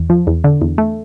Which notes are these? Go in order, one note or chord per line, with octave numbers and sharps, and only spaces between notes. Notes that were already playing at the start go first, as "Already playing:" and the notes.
Already playing: E2
F3
E2
D3
E2
A3